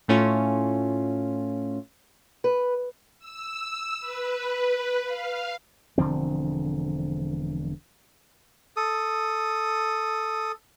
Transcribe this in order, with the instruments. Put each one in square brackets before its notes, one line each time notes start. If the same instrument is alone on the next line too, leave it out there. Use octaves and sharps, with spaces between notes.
[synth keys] A2 A3 C#4 F4
[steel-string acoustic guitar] B4
[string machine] E6
B4
F5
[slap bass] E1 D3 F3 C4
[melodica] A4 D#6